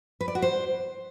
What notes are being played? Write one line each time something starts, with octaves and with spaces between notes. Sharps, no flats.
B4
D5
F#4
C5